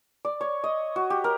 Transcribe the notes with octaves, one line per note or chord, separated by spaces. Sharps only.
D5
C#5
D#5
F#4
G4
A#4